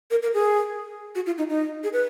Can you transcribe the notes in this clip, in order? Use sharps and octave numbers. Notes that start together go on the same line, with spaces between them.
A#4
A#4
G#4
F#4
F4
D#4
D#4
G#4
B4